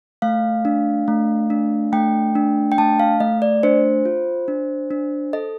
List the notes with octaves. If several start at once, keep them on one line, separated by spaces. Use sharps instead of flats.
A3 F5
D4
A3
D4
A3 G5
D4
G5
A3 A5
F5
A3 D#5
D5
D4 C5
F4
D4
D4
A4 D#5